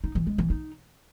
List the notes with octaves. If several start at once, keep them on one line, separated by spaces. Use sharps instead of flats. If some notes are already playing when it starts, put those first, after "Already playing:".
D#4
E3
G#3
E3
D#4